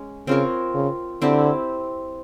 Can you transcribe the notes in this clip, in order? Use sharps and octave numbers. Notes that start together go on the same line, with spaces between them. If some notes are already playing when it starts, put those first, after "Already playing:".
Already playing: G#3 C#4
C#3 C4 F4 A#4 C#5
C#3
D3 C4 E4 G4